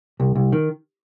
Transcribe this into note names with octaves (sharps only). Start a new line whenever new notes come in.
C2
C2
D#3